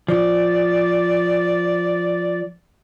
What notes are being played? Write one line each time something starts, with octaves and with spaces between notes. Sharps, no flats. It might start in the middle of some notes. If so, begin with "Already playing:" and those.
F3 D5